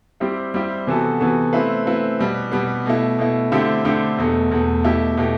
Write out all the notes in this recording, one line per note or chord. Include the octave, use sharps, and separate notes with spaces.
G3 C4 E4 G4
G3 C4 E4 G4
C3 E3 B3 F#4 A4
C3 E3 B3 F#4 A4
A3 C4 E4 B4
A3 C4 E4 B4
B2 G3 B3
B2 G3 B3
B2 A3 E4
B2 A3 E4
D3 A3 C4 E4 G4
D3 A3 C4 E4 G4
E2 B2 A3
E2 B2 A3
B2 A3 E4 G4
B2 A3 E4 G4